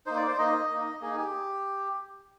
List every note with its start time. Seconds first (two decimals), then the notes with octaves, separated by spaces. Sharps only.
0.06 A#3 D#4 C5
0.17 D5
0.27 C5
0.38 A#3 D#4 D#5
0.70 A#3 D#4
1.01 A#3 D#4 G#4
1.17 G4